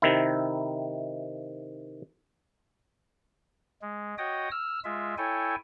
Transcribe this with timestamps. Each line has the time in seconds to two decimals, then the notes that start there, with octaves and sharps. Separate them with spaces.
0.02 C3 D#3 E4
3.82 G#3
4.18 F#4 C#5 D#5 G5 D#6
4.51 E6 F6
4.84 G#3 F4 E5
5.18 E4 A4 C#5 G5 G#5